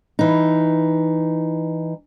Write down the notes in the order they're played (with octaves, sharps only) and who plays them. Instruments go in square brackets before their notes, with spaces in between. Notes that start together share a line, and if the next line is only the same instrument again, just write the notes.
[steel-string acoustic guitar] E3 D#4